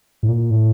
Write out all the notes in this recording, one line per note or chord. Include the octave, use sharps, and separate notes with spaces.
A2
A#2
A2